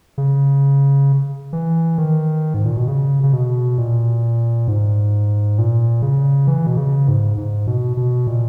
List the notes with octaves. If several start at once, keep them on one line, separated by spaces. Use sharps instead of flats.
C#3
E3
D#3
G#2
A#2
B2
C#3
C#3
B2
A#2
G#2
A#2
C#3
E3
B2
C#3
G#2
G#2
B2
B2
A#2